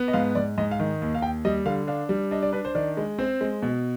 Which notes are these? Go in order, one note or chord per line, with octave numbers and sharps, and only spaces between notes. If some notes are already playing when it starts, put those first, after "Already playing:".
Already playing: B3
D#5
G#2 F5
G#2 D5
G#2 D#5
F5
D#3
D#2
F5
D#2 G5
G3 D#5
D3 F5
D4 F5
G3
D4 D#5
D5
D4 B4
C5
D#3 D5
G#3
C4 C5
G#3
B2